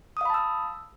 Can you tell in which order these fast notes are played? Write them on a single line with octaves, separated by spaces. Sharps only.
D#6 F5 B5 A5 E6